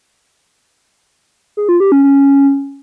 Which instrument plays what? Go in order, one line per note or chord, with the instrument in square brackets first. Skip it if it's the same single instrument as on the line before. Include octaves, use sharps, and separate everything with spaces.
[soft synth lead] G#4
F4
G4
C#4
C#4